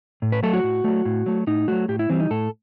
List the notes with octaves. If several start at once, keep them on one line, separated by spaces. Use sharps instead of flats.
A2
B4
F#3 A3 A4
F#4
A2
F#3 A3
A2
F#3 A3
A2 D#4
F#3 A3 F#4
A2 G4
E4
E3 G3 C4
D#4
A2 A4